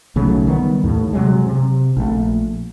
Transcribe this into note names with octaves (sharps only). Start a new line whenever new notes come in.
B1 C#3 F#3 A3
D#3 G3 B3
D#2 A2
C3 F#3 G#3
C3
A#1 A3